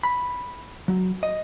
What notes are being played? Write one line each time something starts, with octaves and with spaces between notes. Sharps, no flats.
B5
F#3
D#5